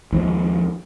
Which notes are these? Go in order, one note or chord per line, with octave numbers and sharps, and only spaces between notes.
D#2 F3 G#3